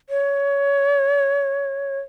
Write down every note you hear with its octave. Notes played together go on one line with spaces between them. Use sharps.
C#5